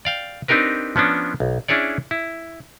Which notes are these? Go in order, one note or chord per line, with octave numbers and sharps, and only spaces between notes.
D5 F5 G5
C4 D4 D#4 G4 A#4 B4
F3 B3 C#4 D4
B1
C#4 D4 E4 G#4 C#5 D5
E4